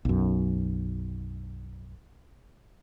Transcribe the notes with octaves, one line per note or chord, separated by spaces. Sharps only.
B1 F#2